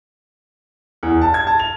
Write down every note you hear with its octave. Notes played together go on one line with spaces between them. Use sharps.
E2
A5
G#6
A5
F7